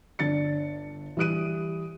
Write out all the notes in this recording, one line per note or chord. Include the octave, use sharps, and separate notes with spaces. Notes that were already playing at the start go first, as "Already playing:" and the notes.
G1 D4 A6 C#7
E3 G3 D#6 F#6 D7 D#7